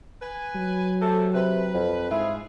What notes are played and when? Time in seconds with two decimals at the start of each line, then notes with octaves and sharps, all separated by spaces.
0.22 B4 G#5
0.55 F#3
1.02 C3 A3 A4
1.34 C3 B4
1.74 F2
2.11 G#2 E4 F4 G#4